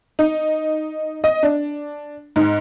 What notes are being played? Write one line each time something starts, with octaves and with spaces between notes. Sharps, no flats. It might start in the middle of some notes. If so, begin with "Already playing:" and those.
D#4
D#5
D4
G#2